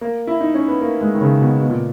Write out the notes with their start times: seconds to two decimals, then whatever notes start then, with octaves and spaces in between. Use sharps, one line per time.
0.01 A#3
0.27 E4
0.40 D#4
0.54 C#4
0.68 B3
0.81 A#3
1.01 G#3
1.15 D#3
1.21 C#3
1.41 B2
1.61 B2
1.70 A#2